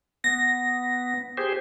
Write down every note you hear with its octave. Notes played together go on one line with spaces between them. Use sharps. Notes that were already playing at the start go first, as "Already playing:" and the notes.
B3 A#6
G4 G#4 C5